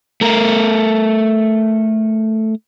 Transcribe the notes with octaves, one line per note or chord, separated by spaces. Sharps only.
A3 A#4